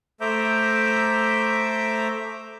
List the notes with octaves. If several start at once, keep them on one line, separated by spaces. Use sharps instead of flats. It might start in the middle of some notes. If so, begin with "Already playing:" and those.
A3 C5 E5 A#5 D6 G6